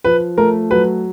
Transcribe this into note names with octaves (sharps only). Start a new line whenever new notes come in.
F3 B4
A3 A#4
F#3 B4